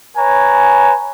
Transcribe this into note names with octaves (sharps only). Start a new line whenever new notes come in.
B4 C#5 G#5 A#5